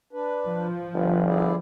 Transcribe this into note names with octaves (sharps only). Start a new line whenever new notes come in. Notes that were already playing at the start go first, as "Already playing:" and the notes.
D4 B4
F3
G1 B4
E4 G#4 D5